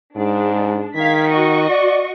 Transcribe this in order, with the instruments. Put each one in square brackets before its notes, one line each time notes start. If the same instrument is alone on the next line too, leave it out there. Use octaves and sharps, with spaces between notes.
[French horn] G#2 [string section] G#3 D4
[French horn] D#3 [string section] F5 G#6 B6
[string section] F#4 D#5 C#6
[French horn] D5